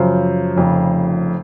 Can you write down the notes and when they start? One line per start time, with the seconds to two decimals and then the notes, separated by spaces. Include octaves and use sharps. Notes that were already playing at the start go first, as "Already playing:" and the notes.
Already playing: F#2 C#3 F3 C5
0.56 F1 F2 C#3